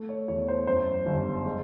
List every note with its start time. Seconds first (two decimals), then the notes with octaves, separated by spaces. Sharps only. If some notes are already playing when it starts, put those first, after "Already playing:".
Already playing: A3
0.09 C#5
0.28 E2 C#5
0.48 C5
0.67 F#2 C5
1.06 G1
1.45 G#3